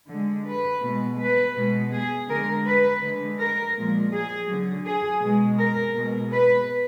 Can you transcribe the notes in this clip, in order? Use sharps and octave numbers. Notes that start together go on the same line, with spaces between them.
D3 G#3
B4
B2 G#3
B4
B2 G#3
G#4
D3 G#3 A#4
B4
D3 G#3
A#4
A#2 F3 G#3
G#4
D3 F#3
G#4
B2 G#3
A#4
B2 G#3
B4